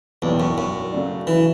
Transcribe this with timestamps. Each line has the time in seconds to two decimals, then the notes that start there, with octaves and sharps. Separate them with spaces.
0.22 B1 E2 A2 G3 D4 G4
0.40 F#2
0.58 F#2
0.92 C#3 F#3 A3 D4
1.27 E3